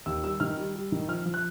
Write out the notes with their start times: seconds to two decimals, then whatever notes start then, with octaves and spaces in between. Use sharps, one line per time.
0.06 D#2 E6
0.23 G3 E6
0.40 D#3 F6
0.58 G3
0.75 G3
0.92 D#3
1.08 F3 F6
1.26 F3
1.34 F#6